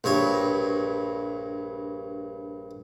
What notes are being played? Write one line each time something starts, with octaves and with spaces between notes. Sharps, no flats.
A#1 G2 C#5